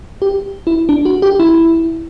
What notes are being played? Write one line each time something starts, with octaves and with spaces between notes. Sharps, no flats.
G4
E4
D4
F#4
G4
E4